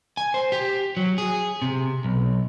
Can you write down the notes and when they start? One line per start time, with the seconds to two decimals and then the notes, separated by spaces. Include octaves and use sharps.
0.17 G#5
0.34 C5
0.52 G4
0.97 F#3
1.18 G#4
1.62 C3
2.04 B1